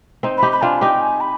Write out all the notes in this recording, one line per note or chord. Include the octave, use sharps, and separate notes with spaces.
C4 D#4
D#4 G4 B5
B5
D4 F4 G5 G#5
D#4 G4 G5
G#5
B5